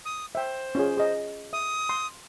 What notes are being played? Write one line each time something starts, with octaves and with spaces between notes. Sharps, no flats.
D#6
C5 E5 G5
C#4 F4 G#4
G#4 D#5
E5 D#6
C6